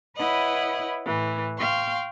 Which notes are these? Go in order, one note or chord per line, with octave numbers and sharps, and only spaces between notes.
E4 B4 C#5 D#5 F#5
A2 E3
F5 G5 C6 C#6